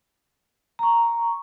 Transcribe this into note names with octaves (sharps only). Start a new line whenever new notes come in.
A#5 C#6